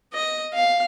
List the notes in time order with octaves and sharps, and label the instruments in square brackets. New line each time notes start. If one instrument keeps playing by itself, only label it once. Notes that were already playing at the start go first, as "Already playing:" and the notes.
[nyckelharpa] D#5
F5